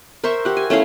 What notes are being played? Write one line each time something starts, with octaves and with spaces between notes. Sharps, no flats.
A#4 C5 E5 C#6
G4 F#5
G#5
A3 C#4 E4 F5